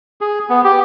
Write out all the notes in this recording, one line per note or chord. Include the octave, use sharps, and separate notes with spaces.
G#4
B3
G4